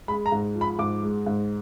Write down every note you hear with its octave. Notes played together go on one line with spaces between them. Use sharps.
G#3 B5
A#5
G#2
F3
B5
G#2 D6
G#3
G#2